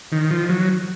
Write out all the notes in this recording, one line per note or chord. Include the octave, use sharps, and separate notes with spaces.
D#3
F3
F#3